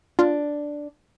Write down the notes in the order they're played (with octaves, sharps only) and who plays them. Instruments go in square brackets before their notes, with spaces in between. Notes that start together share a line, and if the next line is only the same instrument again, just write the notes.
[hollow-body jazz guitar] D4 [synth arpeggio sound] F4